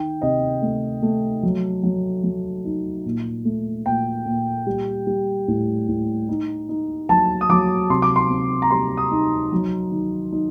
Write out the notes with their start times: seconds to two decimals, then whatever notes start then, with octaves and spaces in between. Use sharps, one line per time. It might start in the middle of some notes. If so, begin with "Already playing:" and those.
Already playing: D#3 G5
0.22 C3 D#5
0.62 A3
1.02 A3
1.43 F#3
1.83 F#3
2.24 F#3
2.65 D#4
3.06 A#2
3.45 A3
3.86 A#2 G5
4.26 A#2
4.67 G3
5.07 G3
5.48 A2
5.88 A2
6.29 D#4
6.69 D#4
7.09 F#3 A5
7.41 D#6
7.50 F#3 D6
7.90 C3 C6
8.02 D6
8.16 C6
8.30 C4
8.62 A#5
8.71 G3 C6
8.97 D#6
9.11 D#4
9.52 F#3
9.92 D#3
10.32 D#4